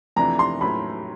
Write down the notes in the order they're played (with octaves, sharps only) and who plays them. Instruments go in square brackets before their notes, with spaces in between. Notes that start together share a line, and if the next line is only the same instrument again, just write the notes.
[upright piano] F2 C3 E3 A3 D4 [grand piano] A#5
[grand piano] C6
[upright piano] A2 F#3 A3 C#4 [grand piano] B5